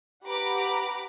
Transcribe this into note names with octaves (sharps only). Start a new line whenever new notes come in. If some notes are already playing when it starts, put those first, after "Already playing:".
G4 B4 F#5 A#5 B5 D6